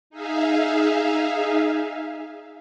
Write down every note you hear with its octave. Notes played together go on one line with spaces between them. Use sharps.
D#4 G#4 E5 F5